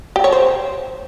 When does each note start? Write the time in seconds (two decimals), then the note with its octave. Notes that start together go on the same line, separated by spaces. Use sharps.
0.16 G4
0.24 C#5
0.32 C5